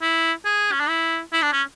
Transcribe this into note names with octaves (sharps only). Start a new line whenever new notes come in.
E4
G#4
C#4
D4
E4
E4
D4
C#4